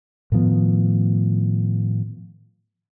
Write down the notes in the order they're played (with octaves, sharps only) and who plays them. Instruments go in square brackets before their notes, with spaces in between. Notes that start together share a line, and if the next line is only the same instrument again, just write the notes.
[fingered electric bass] A2 D#3 F3 B3